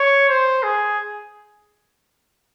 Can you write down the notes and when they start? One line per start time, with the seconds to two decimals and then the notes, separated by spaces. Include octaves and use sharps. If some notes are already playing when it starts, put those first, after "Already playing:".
Already playing: C#5
0.29 C5
0.63 G#4